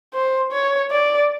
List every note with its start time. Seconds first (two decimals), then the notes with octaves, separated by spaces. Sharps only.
0.14 C5
0.52 C#5
0.91 D5